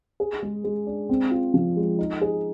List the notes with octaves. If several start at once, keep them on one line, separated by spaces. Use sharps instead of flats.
G#4
G#3
G#3
D4
C4
F4
F3
G#3
D#4
G#4